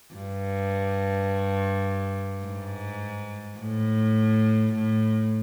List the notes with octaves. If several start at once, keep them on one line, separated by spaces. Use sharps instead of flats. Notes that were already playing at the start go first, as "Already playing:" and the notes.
G2
G#2
A2
A2